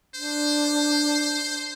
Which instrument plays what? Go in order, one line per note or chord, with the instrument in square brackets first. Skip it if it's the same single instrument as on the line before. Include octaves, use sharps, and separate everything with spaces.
[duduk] D4 [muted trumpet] C5